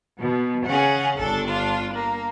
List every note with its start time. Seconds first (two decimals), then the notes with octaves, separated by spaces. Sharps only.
0.22 B2
0.67 C#3 C#4 G#4 F#5
1.18 G1 D4 A4
1.48 F4
1.94 A#3